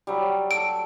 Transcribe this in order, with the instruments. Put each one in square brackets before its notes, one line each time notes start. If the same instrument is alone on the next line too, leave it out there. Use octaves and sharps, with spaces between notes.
[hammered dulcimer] F#3 G3
[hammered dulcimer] A4 [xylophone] D7